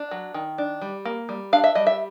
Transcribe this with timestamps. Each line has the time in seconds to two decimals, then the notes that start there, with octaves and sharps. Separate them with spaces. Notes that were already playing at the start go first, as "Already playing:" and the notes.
Already playing: D4
0.11 F#3
0.34 D#3
0.58 D4
0.81 G3
1.05 A#3
1.29 G3
1.53 D4 F5
1.64 E5
1.75 G3 D#5
1.87 E5